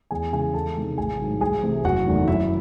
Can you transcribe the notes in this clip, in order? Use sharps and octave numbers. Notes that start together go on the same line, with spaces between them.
E2 G#4 G#5
C#3 E3 G#3 G#4 G#5
E2 A4 A5
C3 D#3 G#3
A1 G#4 G#5
G#2 D#3 F#3
C2 G#4 G#5
C3 E3 A3
F#1 F#4 F#5
E2 D#3 F#3 A3
F#2 E4 E5